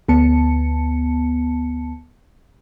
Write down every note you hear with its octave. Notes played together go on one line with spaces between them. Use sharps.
D2 B3 A5 C#7